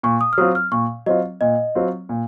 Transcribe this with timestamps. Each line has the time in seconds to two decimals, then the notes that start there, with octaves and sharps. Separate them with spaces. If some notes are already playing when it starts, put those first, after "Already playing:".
0.03 A#2 C#6
0.21 D#6
0.33 F6
0.38 F#3 C4 F4 D#6
0.55 F6
0.72 A#2 C#6
1.06 F#3 C4 F4 D#5
1.41 A#2 D#5
1.75 F#3 C4 F4
2.09 A#2